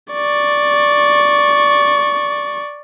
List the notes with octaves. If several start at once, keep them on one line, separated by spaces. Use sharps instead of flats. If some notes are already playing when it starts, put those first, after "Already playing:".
D5 C#6